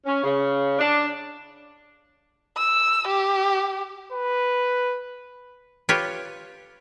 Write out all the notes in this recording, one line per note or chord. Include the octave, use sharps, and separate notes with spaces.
C#4
C#3
D4
E6
G4
B4
F4 G4 B4 C#5